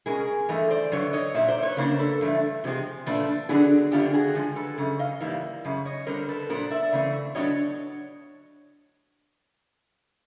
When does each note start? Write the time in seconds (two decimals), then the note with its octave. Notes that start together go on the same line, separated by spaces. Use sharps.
0.06 B2 G#3 C#4 G#4 A#4
0.49 G2 E3 A3 D#5
0.70 C5 D5
0.92 G2 D3 F#3 B4 C#5
1.13 C#5 D#5
1.34 A#2 F#3 A#3 E5
1.48 C5 D5
1.63 B4 C#5
1.77 C#3 F#3 A#3 D4 A#4 C5
1.99 A4 B4
2.21 G2 E3 A3
2.64 C3 F3 G#3 C4
3.06 A#2 F3 A3 D4 A4 B4
3.49 D3 F#3 B3 D4 F#4 G#4
3.92 F#2 D3 F#3 B3 D4 F4 G4
4.14 F#4 G#4
4.35 D3 F3 G#3
4.56 A4 B4
4.78 F#2 C#3
4.99 D#5 F5
5.21 G#2 E3 G3 A#3
5.65 F#2 C#3
5.85 C#5 D#5
6.07 D3 G3 C4 A#4 C5
6.29 A4 B4
6.50 A#2 F#3 B3 D4 A#4 C5
6.70 D5 E5
6.93 C#3 E3 A3 C4
7.35 A2 F#3 B3 D4 C#5 D#5